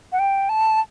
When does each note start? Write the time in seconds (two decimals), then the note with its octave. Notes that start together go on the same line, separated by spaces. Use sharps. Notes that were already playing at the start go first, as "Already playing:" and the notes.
0.12 F#5
0.19 G5
0.49 A5